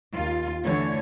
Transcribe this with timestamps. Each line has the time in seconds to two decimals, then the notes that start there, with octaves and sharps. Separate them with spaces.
0.14 D#2 F4
0.66 D3 E3 A3 C#5